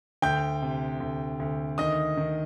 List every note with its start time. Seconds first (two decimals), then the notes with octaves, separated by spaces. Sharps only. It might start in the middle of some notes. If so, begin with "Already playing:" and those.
0.22 D2 G5 G6
0.62 C3
1.00 D2
1.40 D2
1.78 D#3 D#5 D#6
2.17 D#3